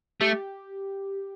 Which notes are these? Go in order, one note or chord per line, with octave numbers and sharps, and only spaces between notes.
A3 G4